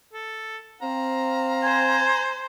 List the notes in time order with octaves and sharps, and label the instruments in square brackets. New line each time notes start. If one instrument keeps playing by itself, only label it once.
[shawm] A4
[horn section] C4 F5 [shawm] A#5
[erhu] C5 [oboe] G#5